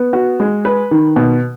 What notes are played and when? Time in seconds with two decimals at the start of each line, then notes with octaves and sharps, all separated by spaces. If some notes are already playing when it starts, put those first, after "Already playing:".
Already playing: B3
0.13 F#4
0.40 G#3
0.65 B4
0.91 D#3
1.16 B2